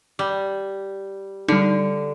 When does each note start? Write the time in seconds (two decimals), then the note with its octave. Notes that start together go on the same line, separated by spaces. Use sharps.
0.19 G3
1.48 D3 G3 D#4